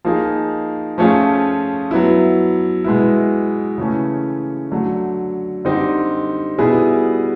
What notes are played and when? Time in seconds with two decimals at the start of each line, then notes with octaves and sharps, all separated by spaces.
0.05 F3 A#3 D#4 G#4
0.98 F3 A3 C#4 F4 G#4
1.91 F#3 B3 E4
2.84 B2 G#3 B3 E4
3.78 C#3 E3 A3 C#4
4.71 D3 F#3 A3
5.65 D3 G3 C4 D#4 G4
6.58 B2 G3 B3 E4 G#4